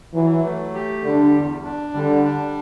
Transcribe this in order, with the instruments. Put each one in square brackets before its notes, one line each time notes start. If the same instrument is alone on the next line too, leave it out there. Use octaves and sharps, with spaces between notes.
[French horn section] E3 [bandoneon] F#3
[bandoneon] A3
G4
[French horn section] D3 [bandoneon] G3
[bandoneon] E2
D4
[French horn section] D3 [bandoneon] G3
[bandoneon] D4